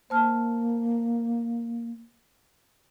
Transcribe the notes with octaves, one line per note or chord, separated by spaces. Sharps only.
A#3 C5 A5 F6